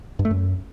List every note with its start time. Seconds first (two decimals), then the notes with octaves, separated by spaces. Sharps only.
0.19 G2
0.25 A3
0.31 F#2